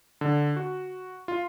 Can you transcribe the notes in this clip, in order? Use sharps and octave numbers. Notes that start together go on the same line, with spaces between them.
D3
F#4
F4